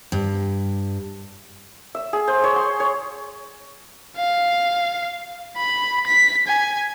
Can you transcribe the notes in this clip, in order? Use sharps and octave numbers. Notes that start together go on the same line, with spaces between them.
G2
E5
G#4
C5
C#5
C6
C#5
F5
B5
B6
G#5